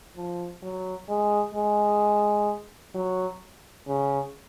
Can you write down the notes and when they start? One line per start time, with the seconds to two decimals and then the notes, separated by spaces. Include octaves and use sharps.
0.16 F3
0.62 F#3
1.09 G#3
1.55 G#3
2.95 F#3
3.87 C#3